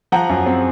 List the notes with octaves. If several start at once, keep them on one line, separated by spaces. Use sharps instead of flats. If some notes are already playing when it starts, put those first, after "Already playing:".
F3 F#5 A#5
F#2
C4